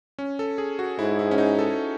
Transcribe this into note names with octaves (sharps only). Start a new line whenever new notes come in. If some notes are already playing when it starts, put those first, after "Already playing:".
C#4
A4
G#4
F#4
G#2 E4
E4
C#4
D#4
A4